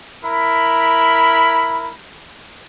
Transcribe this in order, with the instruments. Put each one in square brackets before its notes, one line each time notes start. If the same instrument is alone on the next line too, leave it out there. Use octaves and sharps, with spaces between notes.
[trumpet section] E4 A#4 B5